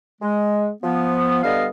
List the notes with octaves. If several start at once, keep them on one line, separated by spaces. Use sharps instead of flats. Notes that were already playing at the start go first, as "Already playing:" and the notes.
G#3
F3 B3
G2 D3 G3 B3 D#5 F5